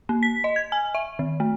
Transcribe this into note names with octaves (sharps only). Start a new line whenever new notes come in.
A#3
B6
D#5
G#6
G#5
E5
D#3
A3